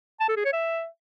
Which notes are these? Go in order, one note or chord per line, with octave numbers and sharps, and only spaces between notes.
A5
A4
G#4
C#5
E5